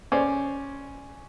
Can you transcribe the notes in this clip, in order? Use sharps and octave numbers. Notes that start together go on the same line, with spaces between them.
C#4 C5 D5